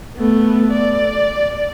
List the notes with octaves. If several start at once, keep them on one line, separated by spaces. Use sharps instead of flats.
A3 B3
D5